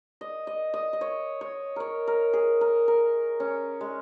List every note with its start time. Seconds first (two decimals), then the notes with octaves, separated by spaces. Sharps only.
0.21 D#5
0.47 D#5
0.74 D#5
0.93 D#5
1.01 C#5
1.41 C#5
1.76 A#4 C#5
2.07 A#4
2.33 G#4
2.61 A#4
2.88 A#4
3.40 C#4
3.81 G#3